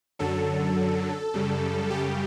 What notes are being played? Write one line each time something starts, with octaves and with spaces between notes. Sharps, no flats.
F#2 D3 F#3 A4
F#2 C#3 G3
G4